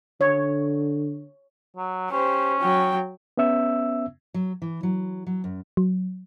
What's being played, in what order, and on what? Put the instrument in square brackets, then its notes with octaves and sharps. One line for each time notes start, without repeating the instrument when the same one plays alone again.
[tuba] D3 [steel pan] C#5
[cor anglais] F#3
[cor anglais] C#4 [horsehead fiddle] G4 C5
[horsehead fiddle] F#3 G5
[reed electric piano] B3 C#4 E5 E6
[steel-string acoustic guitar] F#3
E3
F#3
F#3
F#2
[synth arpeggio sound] F#3